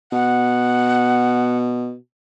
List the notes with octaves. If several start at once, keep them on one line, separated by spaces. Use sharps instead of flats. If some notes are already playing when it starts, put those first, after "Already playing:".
B2 F#5